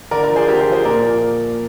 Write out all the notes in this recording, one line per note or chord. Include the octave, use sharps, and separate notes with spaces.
D3 A#4 D5
A#4 D5
F3
G#4 C5
D3 G4 A#4
G#4 C5
F3
G#4 C5
A#2 A#4 D5
F3